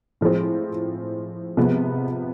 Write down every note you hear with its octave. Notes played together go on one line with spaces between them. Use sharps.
A2 F3 G#3 C4
C3 F3 G#3 B3